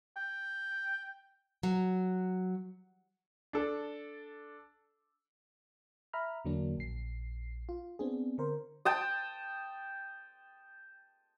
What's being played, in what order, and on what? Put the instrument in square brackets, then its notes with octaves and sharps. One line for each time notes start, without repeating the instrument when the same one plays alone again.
[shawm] G5
[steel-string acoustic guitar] F#3
[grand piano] D4 A4
[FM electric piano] E5 A#5 B5 F6
E2 D3 F#3 A#3 D4
A#1 C7
F4
B3 C4 D4 G#4
D3 A#4 C5
[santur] G5 A5 D#6